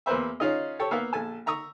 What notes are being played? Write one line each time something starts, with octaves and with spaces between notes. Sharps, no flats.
E2 A#3 B4 C5 E5
C#4 D#4 F4 G#4 D#5
G4 A4 C#5
A#3 B3 E5 F5
A#1 A4 G#5 A5
E5 A#5 C#6 D#6 E6